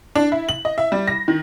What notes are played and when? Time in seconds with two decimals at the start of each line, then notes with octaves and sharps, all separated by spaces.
0.15 D4
0.32 E4
0.49 F#7
0.65 D#5
0.78 E5
0.92 G3
1.07 A#6
1.28 D#3